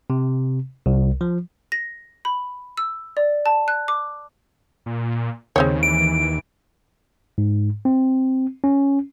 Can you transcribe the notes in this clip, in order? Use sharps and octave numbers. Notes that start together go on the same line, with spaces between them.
C3
C2
F3
A#6
B5
E6
D5
A5
F#6
D6
A#2
D#2 C#3 G#3 C4 C#5
E3 D7
G#2
C4
C#4